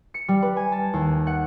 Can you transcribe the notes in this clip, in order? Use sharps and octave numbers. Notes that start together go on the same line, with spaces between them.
C#7
G3
B4
G#5
A5
D#2
F#5